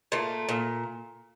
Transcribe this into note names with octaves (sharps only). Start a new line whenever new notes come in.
A#2 A3
A#2